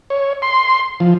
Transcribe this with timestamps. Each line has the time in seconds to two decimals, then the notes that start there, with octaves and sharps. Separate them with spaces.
0.10 C#5
0.42 C6
1.00 F3